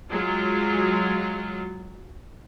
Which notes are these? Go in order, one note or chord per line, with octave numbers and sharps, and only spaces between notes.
F#3 G#3 F4